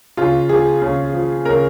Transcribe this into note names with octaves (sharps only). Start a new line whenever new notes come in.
C#3 F4
F3 G#4
C#3
F3
C#3 A#4